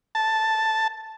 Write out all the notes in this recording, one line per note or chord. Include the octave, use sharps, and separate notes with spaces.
A5